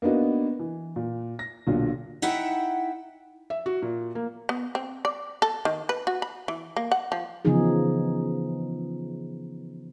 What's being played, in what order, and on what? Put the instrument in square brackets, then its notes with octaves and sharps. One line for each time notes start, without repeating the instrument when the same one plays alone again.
[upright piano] A#3 B3 D4 D#4 F#4
E3
A#2
A#6
B1 A#2 D3
[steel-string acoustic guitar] D#4 E4 E5 F#5 G5
[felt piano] E5
F#4
A#2
A#3
[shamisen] B3
C4
D5
A4
D#3
B4
F#4
B5
E3
A#3
F#5
F3
[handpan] C#3 E3 F3 B3 D#4 G#4